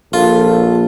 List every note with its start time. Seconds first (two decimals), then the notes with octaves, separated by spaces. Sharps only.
0.13 A#1 F4 A4